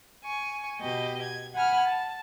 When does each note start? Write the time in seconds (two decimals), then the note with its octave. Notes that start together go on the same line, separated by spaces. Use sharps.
0.24 G#5 C#6
0.80 B2 G4 D#5
1.22 G#6
1.54 F#5 G#5 B5 F6
1.84 A5